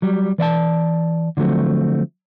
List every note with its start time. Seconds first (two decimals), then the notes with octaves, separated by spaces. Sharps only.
0.02 F#3 G3
0.38 E3 D5 E5 A5
1.37 D3 F3 F#3 A3 C4